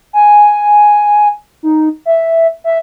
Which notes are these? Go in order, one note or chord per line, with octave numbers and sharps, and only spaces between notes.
G#5
D#4
E5
E5